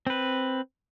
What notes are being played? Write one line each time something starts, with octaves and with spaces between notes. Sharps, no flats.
C4 B4